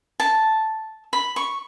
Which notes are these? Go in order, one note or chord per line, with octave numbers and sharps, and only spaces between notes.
A5
B5
C#6